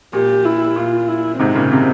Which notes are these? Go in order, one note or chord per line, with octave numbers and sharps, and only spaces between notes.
A#2 G4
E4
A#2 F4
E4
G#2 C3 C4
A#2 C#3
C3